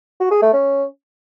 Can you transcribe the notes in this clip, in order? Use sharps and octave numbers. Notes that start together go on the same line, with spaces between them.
F#4
G#4
A3
C#4